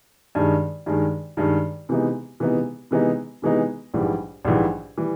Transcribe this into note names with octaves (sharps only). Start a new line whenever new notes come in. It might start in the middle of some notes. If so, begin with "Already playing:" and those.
G2 D#3 G#3
G2 D#3 G#3
G2 D#3 G#3
C3 E3 G#3 B3 D#4
C3 E3 G#3 B3 D#4
C3 E3 G#3 B3 D#4
C3 E3 G#3 B3 D#4
A#1 G#2 E3 G3
A#1 G#2 E3 G3
E3 G3